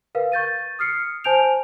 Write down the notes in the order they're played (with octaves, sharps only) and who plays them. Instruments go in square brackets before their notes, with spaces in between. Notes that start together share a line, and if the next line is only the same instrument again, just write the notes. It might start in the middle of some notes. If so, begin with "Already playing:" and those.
[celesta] A#4 B4 F5
C#6 G6 A6 D#7
D#6 F6 C7 C#7
C5 G#5 A5 G6 D7 F7